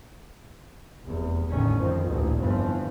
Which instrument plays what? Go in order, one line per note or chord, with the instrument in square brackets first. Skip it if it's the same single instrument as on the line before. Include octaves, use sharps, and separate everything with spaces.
[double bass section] F1 E2
A1 D3 D#3 C#4
F2 D#3
A1 D2 A#2
G1 F2 E3 F3